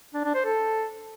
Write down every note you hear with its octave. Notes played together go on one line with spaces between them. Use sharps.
D4
D4
C5
A4